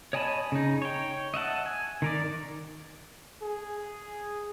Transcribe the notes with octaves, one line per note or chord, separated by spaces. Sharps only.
C#5 D#5 G#5 A5 B5
C#3 D#4
C#5 G5
D#5 E5 F#5 A5
G#5
D#3 A#4 D5
G#4